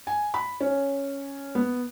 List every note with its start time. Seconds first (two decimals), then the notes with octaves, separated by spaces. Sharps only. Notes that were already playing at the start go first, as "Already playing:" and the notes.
0.07 G#5
0.34 B5
0.61 C#4
1.55 B3